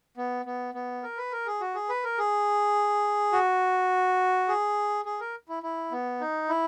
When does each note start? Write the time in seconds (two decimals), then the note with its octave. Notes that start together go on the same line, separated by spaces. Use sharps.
0.17 B3
0.46 B3
0.74 B3
1.03 A#4
1.17 B4
1.32 A#4
1.46 G#4
1.61 F#4
1.75 G#4
1.89 B4
2.04 A#4
2.18 G#4
3.33 F#4
4.48 G#4
5.05 G#4
5.20 A#4
5.49 E4
5.63 E4
5.92 B3
6.21 D#4
6.49 E4